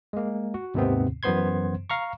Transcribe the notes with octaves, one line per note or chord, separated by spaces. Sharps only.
G#3 A#3
F#4
D#2 G#2 C3 D#3 B3 C4
F#2 E3 B3 C5 C6 G#6
F5 A#5 C#6